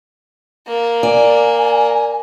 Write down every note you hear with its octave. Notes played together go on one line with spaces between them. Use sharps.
A#3
D5 G#5